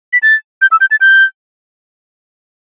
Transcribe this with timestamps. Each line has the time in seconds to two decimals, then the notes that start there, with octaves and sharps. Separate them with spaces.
0.13 B6
0.23 A6
0.62 G6
0.71 E6
0.81 G6
0.91 A6
1.01 G6